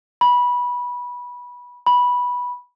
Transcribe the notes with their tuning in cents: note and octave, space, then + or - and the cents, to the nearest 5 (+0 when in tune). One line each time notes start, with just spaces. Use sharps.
B5 -15
B5 -10